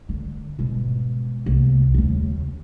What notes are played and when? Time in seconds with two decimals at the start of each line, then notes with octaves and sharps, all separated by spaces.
0.09 D3
0.59 G#1 B2
1.46 C2 A#3
1.94 D#2 C#3